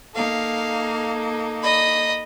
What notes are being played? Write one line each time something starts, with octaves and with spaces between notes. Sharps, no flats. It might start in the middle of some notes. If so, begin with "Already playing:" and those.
A#3 D#4 A4 F5
D#5 B5